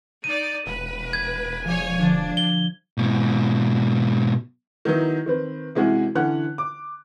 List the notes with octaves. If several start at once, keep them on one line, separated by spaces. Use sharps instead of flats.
D#4 D5 D#7
E1 B4
G#6
F3 G#4 C#5 D5 G#5
D3 F3 D4
G7
G#2 B2
D#3 F#3 B3 D#4 E4
D#3 C4 B4
C3 E3 G#3 C#4 E4 F#4
D3 E3 C#4 F#5 F#6
D6